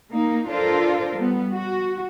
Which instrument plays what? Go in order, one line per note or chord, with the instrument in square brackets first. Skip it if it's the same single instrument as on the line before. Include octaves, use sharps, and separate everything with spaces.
[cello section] A#3 D#4
D4 F4 A4 A#4 C5 D5
G3 B3
F#4